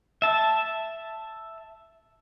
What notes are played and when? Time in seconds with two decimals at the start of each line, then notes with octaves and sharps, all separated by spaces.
0.22 E5 A5